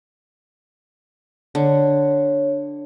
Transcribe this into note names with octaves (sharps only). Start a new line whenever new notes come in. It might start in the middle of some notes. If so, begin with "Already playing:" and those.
D3 C#5